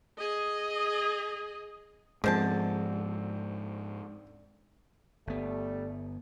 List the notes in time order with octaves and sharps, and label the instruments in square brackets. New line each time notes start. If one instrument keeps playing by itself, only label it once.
[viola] G#4 D#5
[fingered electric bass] G#2 F3 [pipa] D3 C5 A5 [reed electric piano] G#3 [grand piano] C4
[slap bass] G1 B3 [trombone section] G3 A3